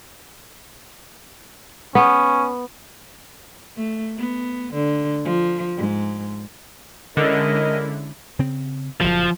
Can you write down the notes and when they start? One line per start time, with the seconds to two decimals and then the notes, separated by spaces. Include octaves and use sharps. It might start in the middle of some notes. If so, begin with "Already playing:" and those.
1.95 B3 C#4
3.76 A3
4.18 B3
4.74 D3
5.24 F3
5.77 G#2
7.17 D3 G#3 C#4 E4 A#4 D#5
8.39 C#3 C4
9.01 F#1 A#2 F3